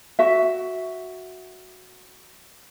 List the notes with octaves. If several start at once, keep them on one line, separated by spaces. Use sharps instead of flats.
F#4 E5